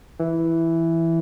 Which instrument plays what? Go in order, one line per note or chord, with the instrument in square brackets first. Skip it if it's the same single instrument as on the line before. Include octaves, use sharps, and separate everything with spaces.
[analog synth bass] E3